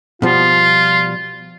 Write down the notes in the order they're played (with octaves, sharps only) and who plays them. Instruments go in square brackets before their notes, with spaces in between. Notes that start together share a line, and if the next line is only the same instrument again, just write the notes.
[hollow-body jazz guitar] B2 F3 G3 [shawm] F4